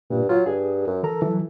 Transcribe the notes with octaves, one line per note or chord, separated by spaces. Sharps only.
G2 A#2
F#3 F4
G2 G#4
F#2
E3 A4 A#4 A#5
E3 F#3